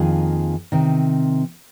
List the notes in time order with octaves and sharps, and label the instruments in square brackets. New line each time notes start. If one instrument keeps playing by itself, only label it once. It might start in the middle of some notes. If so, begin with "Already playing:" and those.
Already playing: [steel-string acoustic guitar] F2 D#3 A#3 F4 G#4
C3 D#3 C4